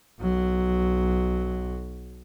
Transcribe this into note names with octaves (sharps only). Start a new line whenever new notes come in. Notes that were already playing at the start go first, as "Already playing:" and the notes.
B1 F#3